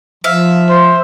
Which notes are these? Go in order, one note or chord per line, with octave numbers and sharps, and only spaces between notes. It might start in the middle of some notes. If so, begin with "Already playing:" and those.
F3 E5 F5
C5